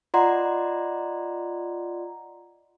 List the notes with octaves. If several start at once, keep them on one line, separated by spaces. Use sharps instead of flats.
F4 D5 D#5 F#5 A#5 C6